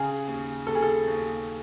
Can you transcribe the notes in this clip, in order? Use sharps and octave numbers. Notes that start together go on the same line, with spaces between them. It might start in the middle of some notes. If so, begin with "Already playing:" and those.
Already playing: C#3 G#4
D#2
D#2 A4
G#4
A4
D#2